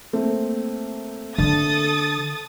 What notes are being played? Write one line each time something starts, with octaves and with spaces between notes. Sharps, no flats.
A3 A#3 C4
D3 A4 D#6 A6